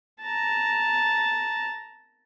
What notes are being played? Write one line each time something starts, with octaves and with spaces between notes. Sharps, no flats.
A5 A#5